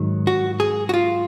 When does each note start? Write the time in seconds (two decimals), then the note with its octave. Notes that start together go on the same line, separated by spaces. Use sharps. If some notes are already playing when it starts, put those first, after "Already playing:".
Already playing: G#2 D#3 F#3
0.27 F#4
0.60 G#4
0.89 F#4
0.94 F4